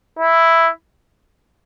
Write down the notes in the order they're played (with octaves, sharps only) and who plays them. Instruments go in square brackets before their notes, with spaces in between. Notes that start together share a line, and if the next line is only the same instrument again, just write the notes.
[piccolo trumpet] E4